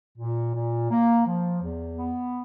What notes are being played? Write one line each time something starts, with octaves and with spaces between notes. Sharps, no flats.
A#2
A#2
A#3
F3
E2
B3